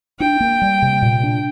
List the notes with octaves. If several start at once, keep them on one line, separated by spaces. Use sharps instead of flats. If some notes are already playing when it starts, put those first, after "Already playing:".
D4 G5
A#3
G3
C3
A#2
D4